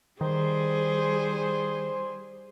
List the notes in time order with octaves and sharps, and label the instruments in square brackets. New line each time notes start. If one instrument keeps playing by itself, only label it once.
[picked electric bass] D#3 [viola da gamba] G3 G#4 [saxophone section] C5